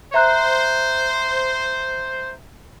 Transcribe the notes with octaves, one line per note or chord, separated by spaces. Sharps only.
C5 E5 A#5 F#6